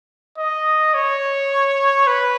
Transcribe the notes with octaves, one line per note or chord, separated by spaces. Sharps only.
D#5
C#5
B4